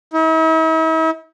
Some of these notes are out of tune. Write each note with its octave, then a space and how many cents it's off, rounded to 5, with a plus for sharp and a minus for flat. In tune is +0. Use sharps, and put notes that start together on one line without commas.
E4 -45